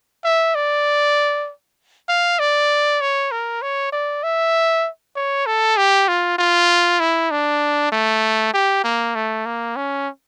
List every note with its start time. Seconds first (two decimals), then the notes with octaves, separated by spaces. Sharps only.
0.24 E5
0.55 D5
2.09 F5
2.39 D5
3.01 C#5
3.31 A#4
3.62 C#5
3.92 D5
4.23 E5
5.16 C#5
5.46 A4
5.77 G4
6.08 F4
6.38 F4
7.00 E4
7.31 D4
7.92 A3
8.54 G4
8.84 A#3
9.15 A3
9.46 A#3
9.76 C#4